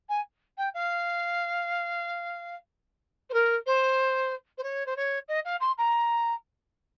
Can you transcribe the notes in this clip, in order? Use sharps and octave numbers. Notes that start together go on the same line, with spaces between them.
G#5
G5
F5
C5
A#4
C5
C5
C#5
C5
C#5
D#5
F5
C6
A#5